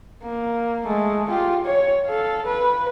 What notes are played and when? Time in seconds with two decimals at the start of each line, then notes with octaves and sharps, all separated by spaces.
0.23 A#3
0.86 G#3 A3
1.30 F4 G4
1.65 C#5
2.06 A4 F5
2.46 B4